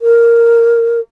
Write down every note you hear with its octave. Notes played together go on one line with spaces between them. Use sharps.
A#4